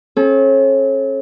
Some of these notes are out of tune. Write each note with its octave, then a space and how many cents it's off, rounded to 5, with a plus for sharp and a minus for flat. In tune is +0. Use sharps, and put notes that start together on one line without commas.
C#4 -35 A4 -40